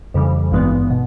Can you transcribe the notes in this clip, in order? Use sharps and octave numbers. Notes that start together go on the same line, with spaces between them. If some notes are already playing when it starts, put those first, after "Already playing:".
F2 C#3 E3 G3
G#1 G2 E3 G#3 B3
B2